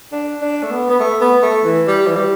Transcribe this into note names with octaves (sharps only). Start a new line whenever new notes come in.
D4
D4
A3
B3
B3
A3
B3
A3
E3
G3
E3
G3